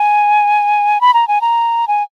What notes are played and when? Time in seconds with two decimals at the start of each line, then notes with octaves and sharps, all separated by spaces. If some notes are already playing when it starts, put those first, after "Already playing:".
Already playing: G#5
1.01 B5
1.14 A#5
1.28 G#5
1.41 A#5
1.88 G#5